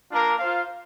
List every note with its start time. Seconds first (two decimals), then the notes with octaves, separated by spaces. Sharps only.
0.11 A#3 D4 F4 A#4
0.39 F4 C5 F5